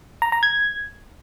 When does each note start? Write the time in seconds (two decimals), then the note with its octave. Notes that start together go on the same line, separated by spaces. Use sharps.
0.22 A#5
0.32 A#5
0.43 G#6